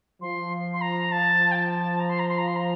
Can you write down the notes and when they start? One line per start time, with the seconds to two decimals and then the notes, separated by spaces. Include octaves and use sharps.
0.21 F3 C6
0.73 C6
0.81 A#5
1.11 A5
1.51 G5
1.55 A5
1.99 A#5
2.09 C6
2.19 A#5
2.28 C6
2.38 A#5
2.47 C6
2.56 A#5